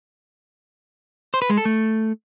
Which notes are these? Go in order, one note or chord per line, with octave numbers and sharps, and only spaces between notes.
C5
B4
G#3
A4
A3